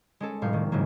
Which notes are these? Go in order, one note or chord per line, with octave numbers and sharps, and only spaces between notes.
G#3 C#4 A4
F1 A2 G3 F5 C#6 G6
D#3 G3 A#3
F2 G#2 C#3 E3 F#3 A#3